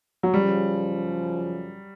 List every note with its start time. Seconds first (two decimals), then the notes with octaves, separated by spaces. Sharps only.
0.23 F#3
0.34 F#2 C#3 F3 G3